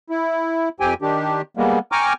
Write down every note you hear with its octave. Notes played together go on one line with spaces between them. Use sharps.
E4
F2 C4 G4 G5 G#5
D#3 D4 G4
G3 G#3 A#3 B3
G5 G#5 A#5 C#6 D6 F6